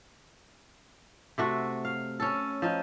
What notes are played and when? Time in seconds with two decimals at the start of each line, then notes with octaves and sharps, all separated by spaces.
1.38 C3 A3 F#4
1.85 F5
2.20 C#4 A4
2.62 F3 D#4